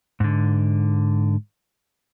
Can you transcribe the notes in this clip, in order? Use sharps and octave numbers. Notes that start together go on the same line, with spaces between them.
G#2 D3